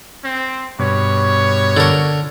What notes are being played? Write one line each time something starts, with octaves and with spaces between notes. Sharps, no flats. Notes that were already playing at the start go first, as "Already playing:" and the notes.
C4
G2 B2 C#5
D3 A#4